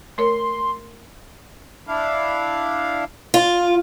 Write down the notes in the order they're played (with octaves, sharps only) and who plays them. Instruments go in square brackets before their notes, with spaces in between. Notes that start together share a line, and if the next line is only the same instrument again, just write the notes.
[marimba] A3 A#4 C#5 [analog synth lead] C6
[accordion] D4 E4 F5
[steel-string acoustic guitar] F4